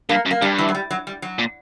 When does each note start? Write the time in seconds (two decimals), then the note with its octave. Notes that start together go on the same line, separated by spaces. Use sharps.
0.09 G2 A#3
0.26 F#2
0.31 A#3
0.42 G2 G3
0.58 E3
0.69 F#3
0.75 G3
0.91 F#3
1.07 G3
1.22 F#3
1.39 A#2